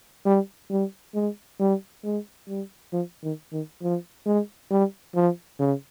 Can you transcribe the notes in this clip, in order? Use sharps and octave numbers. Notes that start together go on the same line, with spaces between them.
G3
G3
G#3
G3
G#3
G3
F3
D#3
D#3
F3
G#3
G3
F3
C#3